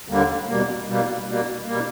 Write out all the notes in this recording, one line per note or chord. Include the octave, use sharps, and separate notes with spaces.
D#2 D3 G3 A#3
B2 G3 A#3
B2 G3 A#3
B2 G3 A#3
B2 G3 A#3